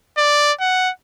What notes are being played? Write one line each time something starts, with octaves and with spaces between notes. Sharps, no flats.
D5
F#5